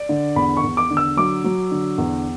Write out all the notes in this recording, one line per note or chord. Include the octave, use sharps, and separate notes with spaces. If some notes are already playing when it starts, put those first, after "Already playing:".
Already playing: D5
D3
E2 B5
C#6
E2
D6
D3
E6
F#3 D6
F#3
D3
E2